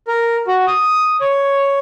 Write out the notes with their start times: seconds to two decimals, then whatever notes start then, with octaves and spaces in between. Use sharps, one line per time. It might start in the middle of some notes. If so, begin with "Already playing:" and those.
0.08 A#4
0.47 F#4
0.67 D#6
1.21 C#5